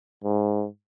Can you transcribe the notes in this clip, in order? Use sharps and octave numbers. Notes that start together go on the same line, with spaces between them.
G#2